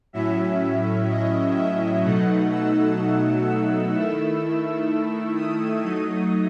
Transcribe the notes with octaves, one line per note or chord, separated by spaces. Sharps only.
A2 F#3 C#4 E4 E5
D#5
E5
B2 F#3 A3 D#4 F#5
E6
E6
D#3 A3 E4 E6
D#6
F#3 A3 D#4 D#6